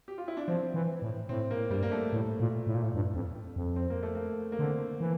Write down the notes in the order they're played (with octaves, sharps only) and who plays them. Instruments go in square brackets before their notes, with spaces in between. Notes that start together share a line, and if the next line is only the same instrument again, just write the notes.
[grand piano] G4
F4
E4
D4
[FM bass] F3 [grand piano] C4
[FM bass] E3
A2
[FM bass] A2 [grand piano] C4
[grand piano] A#3
[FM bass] G2 [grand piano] G3
[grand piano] A#3
A3
[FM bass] A2
A#2
A2
A#2
A2
G2
F2
F2
[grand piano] C4
A#3
A3
A#3
A#3
[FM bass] D3 [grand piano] C4
[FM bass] E3